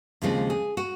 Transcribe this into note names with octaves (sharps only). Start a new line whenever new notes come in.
D#2 C#3 F3 G#3 C4 F4
G#4
F#4